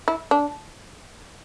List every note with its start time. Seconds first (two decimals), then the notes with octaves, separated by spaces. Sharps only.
0.08 E4
0.31 D4